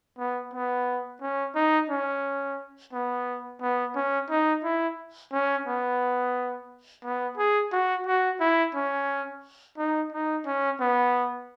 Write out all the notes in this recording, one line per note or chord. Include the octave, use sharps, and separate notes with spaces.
B3
B3
C#4
D#4
C#4
B3
B3
C#4
D#4
E4
C#4
B3
B3
G#4
F#4
F#4
E4
C#4
D#4
D#4
C#4
B3